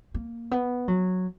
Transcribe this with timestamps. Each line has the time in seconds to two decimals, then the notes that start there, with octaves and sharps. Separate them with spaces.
0.14 A#3
0.51 B3
0.88 F#3